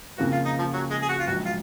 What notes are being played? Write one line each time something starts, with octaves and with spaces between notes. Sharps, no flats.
F2 C#3 F3 A#3 F#4
F4
D#4
F3
F#3
G#3
G#4
F#4
F4
A#1 G#2 F#3 F#4
F4